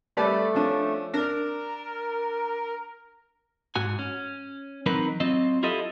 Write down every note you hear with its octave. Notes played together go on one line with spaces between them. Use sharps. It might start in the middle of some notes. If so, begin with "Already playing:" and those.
G3 A3 B4 D5
F3 C#4 D4
D4 A#4
G#2 F#4 G#5
C#4
E3 F#3 C4 D#4 A#4 B4
F#3 C4 F4 D#5
E4 F4 G4 A4 D#5